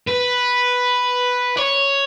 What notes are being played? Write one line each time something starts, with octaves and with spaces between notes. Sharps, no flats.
B4
C#5